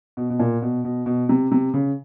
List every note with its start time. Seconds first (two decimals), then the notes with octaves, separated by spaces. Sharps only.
0.17 B2
0.30 B2
0.39 A#2
0.62 B2
0.84 B2
1.06 B2
1.29 C3
1.51 C3
1.74 C#3